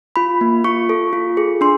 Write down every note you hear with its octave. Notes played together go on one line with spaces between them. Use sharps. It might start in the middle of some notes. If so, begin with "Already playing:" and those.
F4 B5
A#3
F4 C#6
A4
F4
G#4
D4 C6